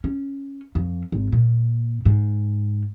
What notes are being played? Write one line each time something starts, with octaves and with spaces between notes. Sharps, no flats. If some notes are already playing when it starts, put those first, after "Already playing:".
C#4
F2
G#1
A#2
G#2